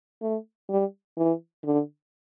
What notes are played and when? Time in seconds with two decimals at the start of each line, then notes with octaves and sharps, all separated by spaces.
0.22 A3
0.69 G3
1.17 E3
1.65 D3